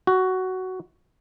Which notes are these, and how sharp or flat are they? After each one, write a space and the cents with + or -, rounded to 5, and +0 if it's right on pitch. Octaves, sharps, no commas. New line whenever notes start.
F#4 +10